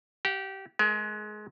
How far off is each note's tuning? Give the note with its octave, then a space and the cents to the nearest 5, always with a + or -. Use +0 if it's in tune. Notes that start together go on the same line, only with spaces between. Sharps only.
G4 -20 F5 +45
G#3 +25 A#4 +15 G#5 +0